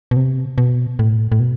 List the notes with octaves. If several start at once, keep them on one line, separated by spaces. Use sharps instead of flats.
B2
C3
B2
A2
A2
B2